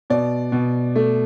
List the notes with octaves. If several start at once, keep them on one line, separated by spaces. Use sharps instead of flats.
B2 D5
B2
A3